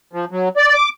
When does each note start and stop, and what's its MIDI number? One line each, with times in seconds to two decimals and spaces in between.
0.13 0.25 53
0.31 0.49 54
0.56 0.74 74
0.74 0.89 86